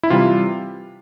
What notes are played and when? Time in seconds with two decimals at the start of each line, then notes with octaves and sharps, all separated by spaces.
0.03 E4
0.10 C3 E3 G3 F4